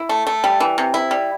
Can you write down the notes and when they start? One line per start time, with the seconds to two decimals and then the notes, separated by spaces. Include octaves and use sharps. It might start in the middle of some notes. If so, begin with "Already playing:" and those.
Already playing: E4
0.09 A3
0.27 A3
0.44 G3
0.60 E3
0.78 C3
0.94 E4
1.11 G3